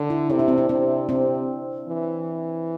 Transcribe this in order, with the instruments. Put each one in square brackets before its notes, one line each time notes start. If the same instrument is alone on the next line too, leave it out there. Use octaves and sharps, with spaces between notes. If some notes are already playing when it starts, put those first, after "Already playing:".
Already playing: [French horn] D3
[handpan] E4
[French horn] C3 [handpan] E4
[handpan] D4
C4
D4
[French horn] C3 [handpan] C4
[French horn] C3 [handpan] C4
[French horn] E3